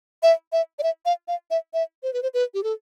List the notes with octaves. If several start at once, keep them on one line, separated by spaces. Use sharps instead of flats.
E5
E5
D5
E5
F5
F5
E5
E5
C5
B4
C5
B4
G4
A4